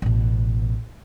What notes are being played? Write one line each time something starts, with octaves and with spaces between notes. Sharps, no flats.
A1 B2